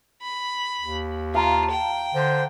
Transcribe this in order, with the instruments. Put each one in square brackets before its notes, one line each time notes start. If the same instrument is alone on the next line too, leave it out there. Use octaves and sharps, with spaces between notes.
[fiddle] B5
[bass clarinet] D#2
[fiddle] F4 [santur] F5 A#5 [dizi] A5
[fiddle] G5
[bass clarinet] D3 [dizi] C5